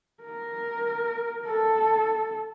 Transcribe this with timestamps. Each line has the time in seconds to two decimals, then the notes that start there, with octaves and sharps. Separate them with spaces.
0.23 A#4
1.46 A4